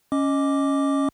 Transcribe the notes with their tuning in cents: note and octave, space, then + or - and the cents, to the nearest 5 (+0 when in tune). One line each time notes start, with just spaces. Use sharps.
C#4 +0 D#5 +0 D6 +0